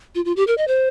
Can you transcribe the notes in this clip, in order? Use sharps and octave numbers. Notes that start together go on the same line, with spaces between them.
F4
F4
G4
A#4
D#5
C5